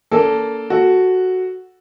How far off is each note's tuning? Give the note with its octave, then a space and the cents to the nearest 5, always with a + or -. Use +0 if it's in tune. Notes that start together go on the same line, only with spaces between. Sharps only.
A#3 +0 D4 -45 A4 +0
F#4 +0 A4 +0